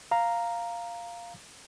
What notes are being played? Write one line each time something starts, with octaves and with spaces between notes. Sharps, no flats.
F5 A#5